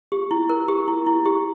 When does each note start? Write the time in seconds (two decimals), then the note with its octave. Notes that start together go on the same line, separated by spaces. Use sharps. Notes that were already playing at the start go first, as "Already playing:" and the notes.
0.12 G4
0.31 E4
0.49 A#4
0.68 G4
0.88 E4
1.06 E4
1.25 G4